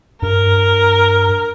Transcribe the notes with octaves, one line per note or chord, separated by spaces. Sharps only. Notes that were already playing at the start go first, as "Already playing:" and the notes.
G2 A#4